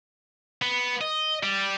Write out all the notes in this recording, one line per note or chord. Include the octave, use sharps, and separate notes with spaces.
B3
D#5
G3